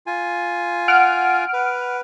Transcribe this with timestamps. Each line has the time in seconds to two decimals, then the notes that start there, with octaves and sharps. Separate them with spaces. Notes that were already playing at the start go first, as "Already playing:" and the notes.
0.07 F4 G#5
0.88 F#5 F6 D7
1.53 B4